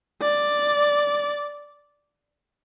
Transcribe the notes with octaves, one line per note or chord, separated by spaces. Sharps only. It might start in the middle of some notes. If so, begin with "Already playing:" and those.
D5